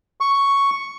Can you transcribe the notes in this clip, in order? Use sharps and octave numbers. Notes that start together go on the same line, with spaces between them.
C#6